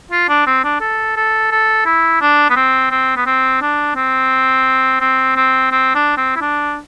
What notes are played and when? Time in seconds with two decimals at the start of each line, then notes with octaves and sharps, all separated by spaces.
0.11 F4
0.29 D4
0.47 C4
0.64 D4
0.81 A4
1.17 A4
1.51 A4
1.86 E4
2.21 D4
2.50 B3
2.56 C4
2.91 C4
3.17 B3
3.26 C4
3.62 D4
3.96 C4
5.01 C4
5.36 C4
5.72 C4
5.95 D4
6.17 C4
6.36 E4
6.41 D4